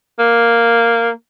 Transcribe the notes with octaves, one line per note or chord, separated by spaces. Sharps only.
A#3